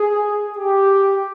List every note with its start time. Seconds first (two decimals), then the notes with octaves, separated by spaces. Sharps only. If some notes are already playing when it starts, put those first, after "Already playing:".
Already playing: G#4
0.58 G4